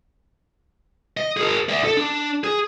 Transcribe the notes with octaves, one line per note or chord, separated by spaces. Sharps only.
D#5
G#4 A#4
D5 E5
A4
D4
G#4